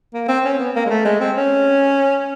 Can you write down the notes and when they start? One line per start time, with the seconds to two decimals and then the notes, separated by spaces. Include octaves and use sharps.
0.14 A#3
0.28 C4
0.45 C#4
0.60 B3
0.75 A#3
0.86 G#3
0.90 A3
1.05 G#3
1.20 C4
1.37 C#4